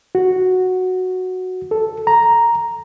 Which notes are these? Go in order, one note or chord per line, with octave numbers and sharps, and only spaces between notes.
F#4
A4
A#5